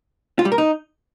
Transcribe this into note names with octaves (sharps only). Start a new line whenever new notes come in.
F4
G3
A#4
D#4